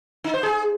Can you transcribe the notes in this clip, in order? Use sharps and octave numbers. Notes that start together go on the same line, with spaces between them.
D#4
C5
G#4